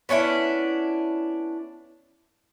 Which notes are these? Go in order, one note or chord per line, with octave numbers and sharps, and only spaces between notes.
B3 C#4 D4 E4